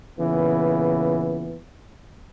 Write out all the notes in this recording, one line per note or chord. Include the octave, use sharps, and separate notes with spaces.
A#2 C#3 E3 B3